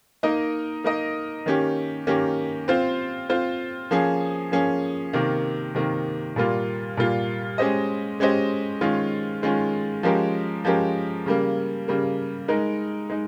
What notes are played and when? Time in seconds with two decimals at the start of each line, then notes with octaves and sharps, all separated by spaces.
0.23 A#3 D#4 A#4 D#5
0.84 A#3 D#4 A#4 D#5
1.46 D#3 A#3 C#4 G4
2.07 D#3 A#3 C#4 G4
2.68 C4 F4 C5
3.29 C4 F4 C5
3.91 F3 A#3 C#4 G#4
4.52 F3 A#3 C#4 G#4
5.13 C3 D#3 A#3
5.75 C3 D#3 A#3
6.36 A#2 G3 A#3 F4
6.97 A#2 G3 A#3 F4
7.58 G#3 C#4 G4 C5 D#5
8.20 G#3 C#4 G4 C5 D#5
8.81 D#3 G#3 C#4 F4
9.42 D#3 G#3 C#4 F4
10.03 F3 G#3 C#4 G4 A#4
10.65 F3 G#3 C#4 G4 A#4
11.26 C#3 G3 A#3
11.88 C#3 G3 A#3
12.48 G#3 D#4 A#4
13.10 G#3 D#4